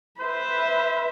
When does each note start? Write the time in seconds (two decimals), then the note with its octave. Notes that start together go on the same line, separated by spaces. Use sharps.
0.20 B4 C5 E5